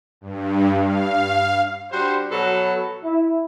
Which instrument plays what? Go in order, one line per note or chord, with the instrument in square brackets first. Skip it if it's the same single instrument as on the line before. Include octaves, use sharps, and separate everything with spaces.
[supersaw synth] G2
F5
[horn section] G3 D4 F#4 C5
B2 F#3 A4 B5
[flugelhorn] E4